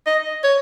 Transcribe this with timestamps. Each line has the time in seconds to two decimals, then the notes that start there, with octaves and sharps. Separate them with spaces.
0.07 D#5
0.44 C#5